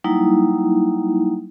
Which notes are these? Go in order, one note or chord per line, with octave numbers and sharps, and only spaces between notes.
F#3 G3 A#3 D#4 E4